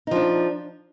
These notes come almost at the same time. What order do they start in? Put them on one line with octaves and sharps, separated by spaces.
D#4 F3 D4